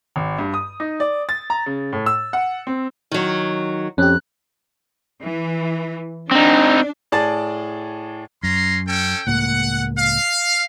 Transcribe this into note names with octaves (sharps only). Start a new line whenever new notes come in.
G#1
G2
D#6
D#4
D5
A6
A#5
C#3
A2
E6
F#5
C4
D#3 F#3
F2 C#4 G4 F#6
E3
C4 D4 D#4
A2 G#4 D5 A5 A6
F#2 C#4 A#5 C6
C#4 A4 G5
C#2 A2 A#3 F#5
F5